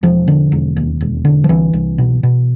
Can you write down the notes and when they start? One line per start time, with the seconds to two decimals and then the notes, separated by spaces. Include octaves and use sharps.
0.03 E1 F3
0.28 D3
0.52 E1
0.76 D#2
1.01 E1
1.25 D3
1.44 F3
1.49 C2 E3
1.73 C2
1.98 B2
2.23 B2